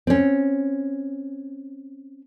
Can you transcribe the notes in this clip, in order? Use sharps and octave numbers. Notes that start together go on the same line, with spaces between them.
C4 C#4